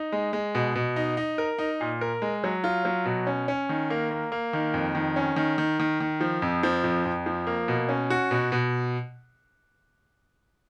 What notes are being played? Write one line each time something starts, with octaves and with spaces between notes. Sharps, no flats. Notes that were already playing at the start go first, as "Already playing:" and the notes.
Already playing: D#4
G#3
G#3
B2
B2
D#4
D#4
A#4
D#4
A#2
A#4
G#3
F#3
F4
F#3
B2
C#4
C#4
D#3
A#3
A#3
A#3
D#3
F2
D#3
C#4
D#3
D#3
D#3
D#3
F3
F2
F3
F2
F2
F3
A#3
B2
C#4
F#4
B2
B2